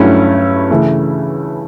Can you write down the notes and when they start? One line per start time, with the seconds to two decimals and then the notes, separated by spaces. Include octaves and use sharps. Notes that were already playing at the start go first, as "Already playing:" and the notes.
Already playing: G2 F#3 A3 C#4 E4
0.70 C#3 E3 A3